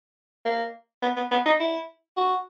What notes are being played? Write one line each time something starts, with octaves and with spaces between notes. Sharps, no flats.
A#3
B3
B3
B3
D#4
E4
F#4